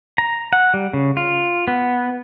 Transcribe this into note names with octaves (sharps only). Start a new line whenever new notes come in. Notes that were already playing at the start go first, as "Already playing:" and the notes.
A#5
F#5
G3
C#3
F4
B3